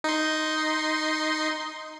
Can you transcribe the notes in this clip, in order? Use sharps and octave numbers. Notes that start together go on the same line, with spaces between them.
D#4 C6